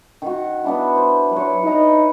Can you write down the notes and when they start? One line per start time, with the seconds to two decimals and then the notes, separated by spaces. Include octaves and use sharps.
0.22 D#3 F#4
0.64 B3 D4 E4
0.95 C5
1.33 F#3 B4 C#5
1.63 D#4 B4 A#5